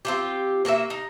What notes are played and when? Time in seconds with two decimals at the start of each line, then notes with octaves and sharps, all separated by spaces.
0.05 C4 F4 G4
0.65 A#3 F#4 G4 E5
0.90 D#4